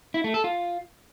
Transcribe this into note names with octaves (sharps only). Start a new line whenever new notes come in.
E4
A3
A4
F4